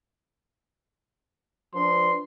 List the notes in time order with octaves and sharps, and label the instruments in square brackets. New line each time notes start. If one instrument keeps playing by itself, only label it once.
[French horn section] F3 D4 B4 [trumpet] C6